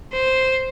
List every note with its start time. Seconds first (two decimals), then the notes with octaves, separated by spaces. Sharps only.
0.13 C5